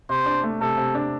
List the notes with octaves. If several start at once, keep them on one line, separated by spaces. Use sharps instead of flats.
C3 C5
D4
A3
C3 A4
C3
D4